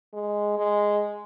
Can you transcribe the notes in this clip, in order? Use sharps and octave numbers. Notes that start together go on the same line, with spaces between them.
G#3
G#3